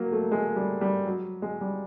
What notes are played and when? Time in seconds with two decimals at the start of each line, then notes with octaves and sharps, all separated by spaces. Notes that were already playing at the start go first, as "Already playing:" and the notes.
Already playing: F#3 A#3
0.12 A3
0.32 G#3
0.56 G3
0.81 G3
1.06 F#3
1.42 G#3
1.61 G3